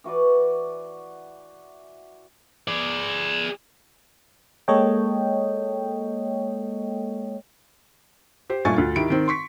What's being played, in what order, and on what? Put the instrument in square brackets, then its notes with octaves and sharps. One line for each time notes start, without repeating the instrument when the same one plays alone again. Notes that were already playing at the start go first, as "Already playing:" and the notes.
[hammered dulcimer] E3 F#4 B4 D5
[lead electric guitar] G#4 D5
[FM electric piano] G#3 A#3 A4 C#5 D#5 G5
[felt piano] G4 C5
G2 A#2 A3 G#5 C#6 A6
D2 F4
D#3 E4 G4 B5 D7
D#3 C4
C6 C#6 B6